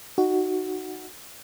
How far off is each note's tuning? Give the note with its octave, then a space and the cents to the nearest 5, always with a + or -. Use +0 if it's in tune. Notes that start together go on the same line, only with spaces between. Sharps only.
D#4 -5 F#4 +5